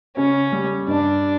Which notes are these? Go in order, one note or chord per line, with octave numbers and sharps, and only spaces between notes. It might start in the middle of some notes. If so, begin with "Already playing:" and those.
C#3 C#4
G3
G2 D4